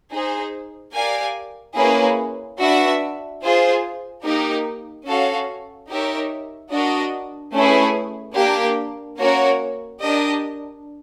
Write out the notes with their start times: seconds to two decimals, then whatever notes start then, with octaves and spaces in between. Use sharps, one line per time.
0.12 D#4 G#4 C5
0.95 G4 A#4 D5 F5 G#5
1.76 A#3 C#4 E4 G#4 B4
2.59 D4 F#4 B4 E5
3.42 F4 G#4 C5
4.24 A#3 D#4 G4 A#4
5.07 C#4 F#4 A4 C#5 F5
5.89 D#4 G4 A#4 C#5 E5
6.72 D4 F#4 A#4 D#5
7.54 A3 C#4 E4 G#4 B4
8.36 A#3 D4 G4 A#4
9.19 A#3 C#4 F#4 A#4 C#5
10.01 D4 G4 A#4 D#5